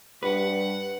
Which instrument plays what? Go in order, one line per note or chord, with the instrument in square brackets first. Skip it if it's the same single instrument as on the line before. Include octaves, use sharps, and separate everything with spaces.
[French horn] G2 [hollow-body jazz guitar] B4 [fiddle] F#5